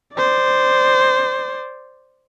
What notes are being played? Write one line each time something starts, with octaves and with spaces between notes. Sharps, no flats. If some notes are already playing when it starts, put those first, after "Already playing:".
C5 D5